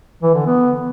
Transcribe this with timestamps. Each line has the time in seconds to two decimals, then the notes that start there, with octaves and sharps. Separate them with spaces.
0.22 E3
0.34 D3
0.46 B3